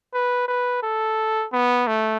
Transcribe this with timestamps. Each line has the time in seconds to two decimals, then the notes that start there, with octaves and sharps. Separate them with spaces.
0.14 B4
0.48 B4
0.83 A4
1.53 B3
1.88 A3